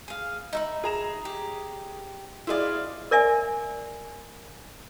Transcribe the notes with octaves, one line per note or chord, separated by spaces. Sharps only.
G#4 F5
D#4 E5 B5
G#4 A#5 E7
G4
E4 G#4 C5 D5 D#5 F5
A#4 D5 E5 G#5